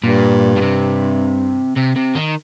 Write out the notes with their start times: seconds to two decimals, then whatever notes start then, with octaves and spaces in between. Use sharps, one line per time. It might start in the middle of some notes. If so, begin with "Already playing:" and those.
0.04 G2 A#2
0.57 A#2
0.62 C3
1.77 C3
1.96 C3
2.15 D#3